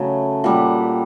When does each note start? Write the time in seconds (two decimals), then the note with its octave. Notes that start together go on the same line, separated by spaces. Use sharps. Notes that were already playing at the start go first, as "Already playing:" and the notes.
Already playing: C#3 F#3 A3 E5
0.44 A#2 G3 F#5